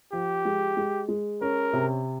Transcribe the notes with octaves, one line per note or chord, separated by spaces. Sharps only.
F3 G4
G#3
G#3
G#3
C#4 A#4
C3